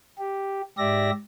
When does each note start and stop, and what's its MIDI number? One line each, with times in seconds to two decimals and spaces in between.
0.19 0.62 67
0.78 1.11 44
0.78 1.11 67
0.78 1.11 74
0.78 1.11 76
0.78 1.11 94